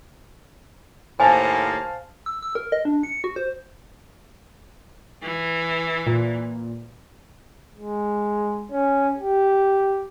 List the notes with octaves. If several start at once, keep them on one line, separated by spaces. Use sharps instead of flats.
D#2 A2 A#3 C5 F5 G#5 A5
E6
E6
A#4
D#5
D4
C#7
F#4
C5
E3
A#2
G#3
C#4
G4